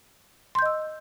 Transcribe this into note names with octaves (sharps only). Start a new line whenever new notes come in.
D#5 C6 E6 G6